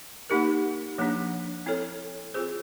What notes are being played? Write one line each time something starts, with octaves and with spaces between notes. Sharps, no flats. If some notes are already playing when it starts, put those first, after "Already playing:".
A#3 D#4 G4 A#4
F3 A#3 D4
C4 E4 A4 C#5
C4 F4 G#4 C5